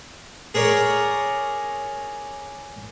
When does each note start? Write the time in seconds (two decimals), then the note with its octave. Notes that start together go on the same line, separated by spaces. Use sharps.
0.55 G#4 A#4 C#5 D5 A#5